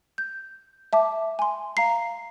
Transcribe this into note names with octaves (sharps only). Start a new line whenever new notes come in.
G6
E5 A5 D6
G#5 C6
F5 A#5 C7